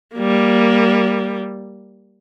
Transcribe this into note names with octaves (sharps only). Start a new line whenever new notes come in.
G3 A#3